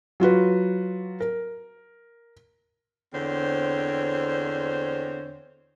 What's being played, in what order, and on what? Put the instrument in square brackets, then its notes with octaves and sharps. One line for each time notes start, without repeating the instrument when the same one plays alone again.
[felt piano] F#3 F4 F#4 B4
A#4
[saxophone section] E2 D3 C4 C5 C#5